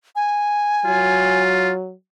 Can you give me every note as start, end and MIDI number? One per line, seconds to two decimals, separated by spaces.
0.16 1.42 80
0.85 1.93 54
0.85 1.73 65